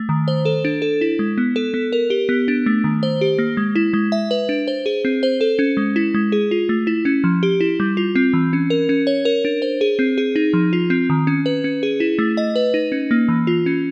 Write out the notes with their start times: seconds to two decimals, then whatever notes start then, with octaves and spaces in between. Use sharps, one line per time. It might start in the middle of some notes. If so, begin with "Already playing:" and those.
Already playing: A3
0.09 D#3
0.28 C5
0.45 A4
0.65 D4
0.82 A4
1.01 E4
1.19 G#3
1.38 B3
1.56 A4
1.74 B3
1.93 A#4
2.10 G4
2.29 B3
2.48 D4
2.66 A3
2.84 D#3
3.03 C5
3.21 G4
3.39 A#3
3.57 G#3
3.75 E4
3.93 G#3
4.12 E5
4.31 B4
4.49 D4
4.68 C5
4.86 G#4
5.05 C4
5.23 C5
5.41 A4
5.59 C#4
5.77 G#3
5.96 E4
6.14 G#3
6.32 G#4
6.51 F4
6.69 A3
6.87 E4
7.05 C#4
7.24 F3
7.43 G4
7.61 E4
7.80 G3
7.97 F4
8.15 C4
8.33 E3
8.53 C#4
8.70 A#4
8.89 C#4
9.07 C#5
9.25 A#4
9.45 D4
9.62 C5
9.81 G#4
9.99 C4
10.18 G#4
10.36 D#4
10.53 F3
10.73 F4
10.90 C4
11.10 D#3
11.27 C#4
11.46 B4
11.64 C#4
11.83 G#4
12.00 E4
12.19 A3
12.37 D#5
12.56 B4
12.74 D#4
12.92 C#4
13.11 A#3
13.28 E3
13.47 F4
13.66 C#4